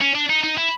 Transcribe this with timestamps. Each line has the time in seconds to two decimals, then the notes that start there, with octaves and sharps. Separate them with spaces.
0.01 C#4
0.15 D4
0.29 D#4
0.43 D#4
0.58 E4